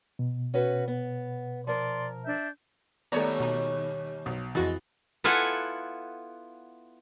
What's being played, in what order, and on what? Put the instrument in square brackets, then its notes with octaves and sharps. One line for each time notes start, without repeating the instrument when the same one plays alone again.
[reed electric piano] B2
[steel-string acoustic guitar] C#4 F#4 B4
B3
[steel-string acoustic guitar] F3 A#4 A#5 [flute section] D5 C6
[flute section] D4 E5 G6
[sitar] D#2 G3 C#5 [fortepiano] A3 B3 [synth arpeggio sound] D5 A#5
[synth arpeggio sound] B2 D#4
[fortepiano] B1
[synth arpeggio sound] F2 F#4 A6 [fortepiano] E3 [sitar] G#3
[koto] B3 E4 F4 A4 F#5 G#5